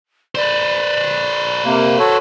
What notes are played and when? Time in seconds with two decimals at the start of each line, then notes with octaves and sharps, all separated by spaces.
0.35 B4 C5 D5
1.65 C3 A#3
1.99 F#4 A4 C#5